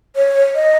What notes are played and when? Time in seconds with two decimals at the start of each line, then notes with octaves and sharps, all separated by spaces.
0.16 C#5
0.55 D#5